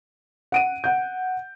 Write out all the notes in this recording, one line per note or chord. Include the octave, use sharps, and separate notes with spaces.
F#5 D7 D#7
F#5 G6